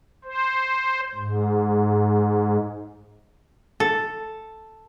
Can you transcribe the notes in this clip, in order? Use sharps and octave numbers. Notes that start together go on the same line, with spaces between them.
C5
G#2
A4